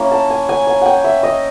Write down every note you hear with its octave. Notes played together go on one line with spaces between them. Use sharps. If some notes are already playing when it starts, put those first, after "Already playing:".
Already playing: A#3 C#4 E4
A5
G#5
G#5
G#5
F#5 G5
E5
D#5